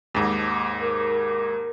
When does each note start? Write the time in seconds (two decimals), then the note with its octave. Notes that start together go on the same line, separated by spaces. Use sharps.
0.15 D#2 G#2
0.82 A#4